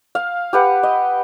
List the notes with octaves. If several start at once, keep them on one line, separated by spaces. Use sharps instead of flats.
F5
G4 B4 F#5
D#5